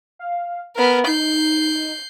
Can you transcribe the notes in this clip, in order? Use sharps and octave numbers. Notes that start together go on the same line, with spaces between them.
F5
B3 A#4 F6
D#4 G6 C7